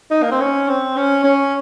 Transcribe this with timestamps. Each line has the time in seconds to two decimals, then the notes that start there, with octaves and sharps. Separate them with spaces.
0.11 D#4
0.23 A#3
0.31 C4
0.40 C#4
0.68 C4
0.96 C#4
1.24 C#4